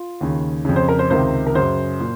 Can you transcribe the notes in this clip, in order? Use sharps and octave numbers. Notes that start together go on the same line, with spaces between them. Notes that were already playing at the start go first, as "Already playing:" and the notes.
Already playing: F4
D#2 C#3
F2 C#3
C5
A#4
C5
C#2 C3 D#3 C5
A#4
F#2 C#3 C5
A#2